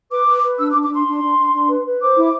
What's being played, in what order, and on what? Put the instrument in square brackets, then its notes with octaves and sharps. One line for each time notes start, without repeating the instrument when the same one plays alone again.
[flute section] B4 D6
B4
B4
D4 E6
D6
D4
D6
D4 C6
D4
D4
D4
D4
B4
B4
C5 D6
E4